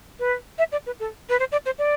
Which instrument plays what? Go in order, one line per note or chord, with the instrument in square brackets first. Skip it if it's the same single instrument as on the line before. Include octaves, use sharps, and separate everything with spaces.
[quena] B4
E5
D5
B4
A4
B4
C5
D5
C5
D5